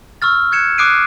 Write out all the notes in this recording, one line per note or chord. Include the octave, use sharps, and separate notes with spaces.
C#6 E6 F6 A6
F#6 G#6 C#7 E7
D6 D#6 F#6 C7 D7 D#7